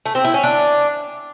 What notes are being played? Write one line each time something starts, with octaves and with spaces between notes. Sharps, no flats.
A3
C4
E4
C#4
D4